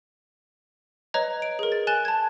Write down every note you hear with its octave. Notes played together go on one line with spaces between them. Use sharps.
B4 C#5 D#5 A#5 G#6
D7
G#4 A#4
A6
G#5 F#6 A6 E7 G7
A5 G#6